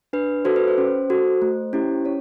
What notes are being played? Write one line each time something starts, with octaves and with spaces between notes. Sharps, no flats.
D4 B4
F#4 A4 C5
B4
C5
C#4
F#4 A4
A3
C#4 E4 G4
C#4 C#5